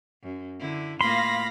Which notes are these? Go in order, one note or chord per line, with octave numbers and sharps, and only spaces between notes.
F#2
D3 E4
A2 A#3 F4 F5 B5 C6 A#6